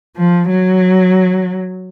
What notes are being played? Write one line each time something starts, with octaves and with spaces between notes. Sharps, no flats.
F3
F#3